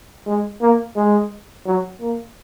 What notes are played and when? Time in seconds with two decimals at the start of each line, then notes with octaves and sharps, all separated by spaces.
0.26 G#3
0.61 A#3
0.96 G#3
1.66 F#3
2.01 A#3